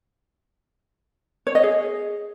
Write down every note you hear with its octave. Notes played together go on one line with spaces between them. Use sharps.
C#5
D#5
G#4